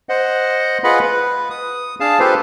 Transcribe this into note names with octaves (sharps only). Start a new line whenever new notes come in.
C5 D#5 F#5
F4 G#4 B4 D#5 F#5 B5
B4
D#6
D4 G#4 F5 A5
F4 G4 A4 B4 C5 F5